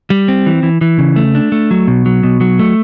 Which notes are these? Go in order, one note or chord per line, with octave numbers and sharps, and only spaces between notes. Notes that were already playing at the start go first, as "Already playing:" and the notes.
G3
C4
E3
E3
E3
C#3
A3
D4
A3
F#3
B2
F#3
B2
F#3
A3